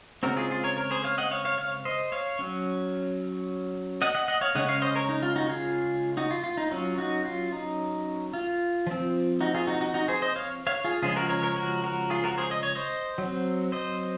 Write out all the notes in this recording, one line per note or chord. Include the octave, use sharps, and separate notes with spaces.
C#3 G#3 C4 F#4 A#4
F4 G#4
F4 G#4
A#4 C#5
A#4 C#5
G#4 C5
C#5 F5
D#5 F#5
C#5 F5
C#5 F5
C#5 F5
C5 D#5
C#5 F5
F#3 C#4
D#5 F#5
D#5 F#5
D#5 F#5
C#5 F5
C#3 G#3 C#4 D#5 F#5
C#5 F5
C5 D#5
A#4 C#5
D#4
F4
D#4 F#4
F4 G#4
D#4 F#4
F4
F4
D#4
F#3 C#4 F4
D#4 F#4
F4
D#4
F4
F3 C4
D#4 F#4
F4 G#4
D#4 F#4
D#4 F#4
D#4 F#4
G#4 C5
C5 D#5
C#5 F5
C#5 F5
F4 G#4
C#3 F3 G#3 C#4 F4 G#4
F#4 A#4
A#4 C#5
A#4 C#5
F#4 A#4
F#4 A#4
F4 G#4
F#4 A#4
G#4 C5
D#5
C#5
C5 D#5
F#3
C4
C5 D#5